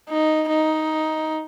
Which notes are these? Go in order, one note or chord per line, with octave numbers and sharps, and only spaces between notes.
D#4
D#4